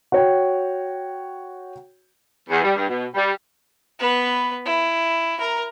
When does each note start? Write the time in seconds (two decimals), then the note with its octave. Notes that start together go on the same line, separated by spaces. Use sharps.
0.12 F#4 C#5 G5
2.49 E2
2.63 G3
2.76 G2
2.88 B2
3.14 G3
3.99 B3 B4
4.65 E4
5.40 A#4 A#5